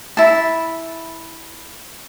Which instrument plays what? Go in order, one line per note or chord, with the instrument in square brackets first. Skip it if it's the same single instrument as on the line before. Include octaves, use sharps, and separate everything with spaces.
[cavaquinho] E4 A5